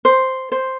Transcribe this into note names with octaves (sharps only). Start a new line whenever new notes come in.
C5
C5